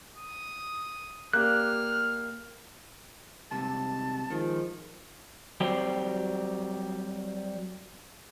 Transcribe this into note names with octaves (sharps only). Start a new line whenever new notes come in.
D#6
A#3 G4 D5 F6 F#6
C2 G#2 C3 A5
D#3 F3 G#3
F#3 G3 C4 G4